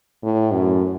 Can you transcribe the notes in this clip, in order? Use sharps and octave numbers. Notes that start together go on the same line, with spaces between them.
A2
F#2